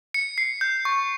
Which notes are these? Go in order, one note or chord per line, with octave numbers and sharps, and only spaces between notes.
C#7
C7
G6
C#6